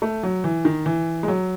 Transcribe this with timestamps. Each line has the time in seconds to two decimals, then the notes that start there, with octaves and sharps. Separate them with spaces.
0.02 A3
0.23 F#3
0.44 E3
0.65 D#3
0.86 E3
1.23 G#3
1.28 F#3